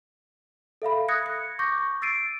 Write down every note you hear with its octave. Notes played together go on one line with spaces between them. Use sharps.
A4 E5 F5 B5
D#6 F#6 G#6 A#6 C#7
C#7
C#6 D6 G6 A#6
E6 A6 C7 D7 D#7